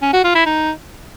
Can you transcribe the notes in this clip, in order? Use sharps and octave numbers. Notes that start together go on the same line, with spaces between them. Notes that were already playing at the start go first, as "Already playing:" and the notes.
C#4
F#4
F4
E4
D#4